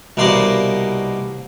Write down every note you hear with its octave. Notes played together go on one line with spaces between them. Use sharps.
C2 B2 A#3 D5 C6